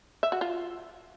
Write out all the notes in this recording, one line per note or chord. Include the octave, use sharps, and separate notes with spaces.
E5
F#4
F4